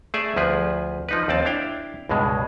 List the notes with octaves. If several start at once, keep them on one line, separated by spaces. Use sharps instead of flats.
A3 G#4 D5 E5
D2 F3 G#4 B4
F3 D#4 B4
D#2 C4 D5 A5
D4 E4 F5 G5
C#2 G2 B2 G#3